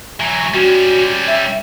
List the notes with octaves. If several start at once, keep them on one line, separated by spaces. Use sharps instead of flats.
E3 F#3
G3 C#4 F#4
E5